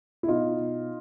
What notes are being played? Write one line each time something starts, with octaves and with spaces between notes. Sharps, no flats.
E4
B2 D#4 F4
B2